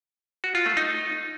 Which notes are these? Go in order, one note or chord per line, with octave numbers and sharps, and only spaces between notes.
F#4
F4
A3
D#4